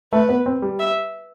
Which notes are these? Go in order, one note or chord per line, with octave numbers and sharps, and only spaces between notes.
A3 B4
B3
C4
G3
E5